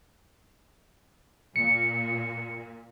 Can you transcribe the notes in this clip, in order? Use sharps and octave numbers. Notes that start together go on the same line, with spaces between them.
A#2 C#7